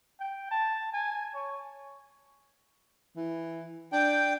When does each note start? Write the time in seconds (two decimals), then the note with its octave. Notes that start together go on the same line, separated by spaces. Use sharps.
0.20 G5
0.51 A5
0.93 G#5
1.35 C#5
3.16 E3
3.92 D4 G5